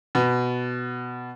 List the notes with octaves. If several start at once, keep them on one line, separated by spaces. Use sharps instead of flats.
B2